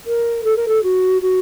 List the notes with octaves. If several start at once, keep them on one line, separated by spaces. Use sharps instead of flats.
A#4
A4
A#4
A4
F#4
F#4